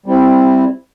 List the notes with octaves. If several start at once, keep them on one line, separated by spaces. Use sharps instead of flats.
G3 C4 E4